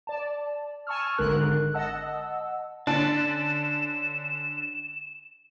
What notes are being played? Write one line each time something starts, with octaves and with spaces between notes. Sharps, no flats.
D5 A5
G#5 A5 C#6 E6 F6
G#1 D3 G#3 A#4 F#6
D#5 F#5 A5 E6
D3 C#4 D4 A5 E7